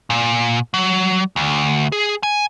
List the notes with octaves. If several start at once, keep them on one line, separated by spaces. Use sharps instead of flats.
A#2
F#3
D2
G#4
G#5